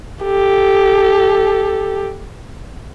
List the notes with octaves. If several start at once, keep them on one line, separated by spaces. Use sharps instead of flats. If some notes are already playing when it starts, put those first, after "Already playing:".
G4 A4